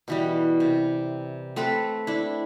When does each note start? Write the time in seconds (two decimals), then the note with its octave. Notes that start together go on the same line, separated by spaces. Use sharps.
0.08 B2 E3 G3
0.60 C3
1.56 A3 C4 A4 B4
2.07 D4 E4